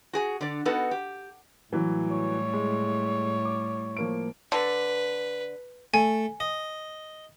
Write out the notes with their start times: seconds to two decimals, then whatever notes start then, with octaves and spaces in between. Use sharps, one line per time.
0.13 F#4 G#4 G#5
0.41 D3 D5
0.65 B3 D#4 F#4 A4 B4
0.91 G4
1.72 A2 E3 F#3 G3
2.12 C#5
2.53 G#3
3.45 D6
3.97 F3 A#3 D7
4.52 D3 B4
5.94 A3 G#5
6.40 D#5